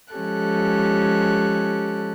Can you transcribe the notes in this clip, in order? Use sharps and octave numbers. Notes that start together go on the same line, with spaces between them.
F3 G#3 C#4 G4 A4 F#6